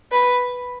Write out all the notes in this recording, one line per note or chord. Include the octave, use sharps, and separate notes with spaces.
B4